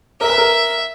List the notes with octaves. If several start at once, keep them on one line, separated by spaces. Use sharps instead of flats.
A#4 E5
B4
A#4